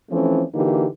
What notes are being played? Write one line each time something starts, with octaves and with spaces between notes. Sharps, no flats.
E3 F3 A3 C4 C#4
D3 E3 A#3 D#4 F#4 G4